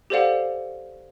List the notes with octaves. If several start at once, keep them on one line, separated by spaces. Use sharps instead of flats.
G4 A4 C5 D5 F5 F#5